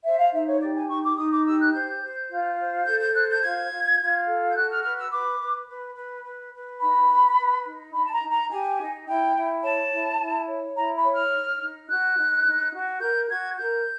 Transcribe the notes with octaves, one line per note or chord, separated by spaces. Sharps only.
C5 E5
F5
D#4 E5
C#5
G4 D5
G#5
D#4 C#6
D6
D#4 D#6
D6
G4 E6
F#6
C5 G6
C5
F4
C5
A4 G6
G6
C5 F#6
G6
F4 G#6
F4
F4
A4
G6
F#4 F#6
F6
B4 F6
E6
B4 D6
B4
B4
B4
B4
B4
D#4 B5
B4
B4
D#4
D#4 B5
A5
A#5
D#4
A#5
G4 G#5
D#4
E4 G5
E4
C#5 A5
E4
E4
C#5
E4 A#5
B5
C#5
F6
D#4
D#4
F#4 F#6
D#4
D#4
F#4
A#4 G6
F#4 G#6
A#4 G6